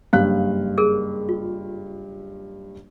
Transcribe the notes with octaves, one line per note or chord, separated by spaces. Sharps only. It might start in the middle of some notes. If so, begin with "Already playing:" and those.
F#1 G2 F5 F#6
G#4 A#4
F4